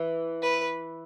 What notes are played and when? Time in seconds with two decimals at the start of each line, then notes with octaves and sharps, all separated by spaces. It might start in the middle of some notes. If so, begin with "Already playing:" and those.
Already playing: E3
0.42 B4